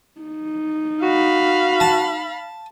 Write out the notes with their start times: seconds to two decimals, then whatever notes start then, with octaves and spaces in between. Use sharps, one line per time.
0.21 D#4
1.02 F#4 F5 B5
1.80 A5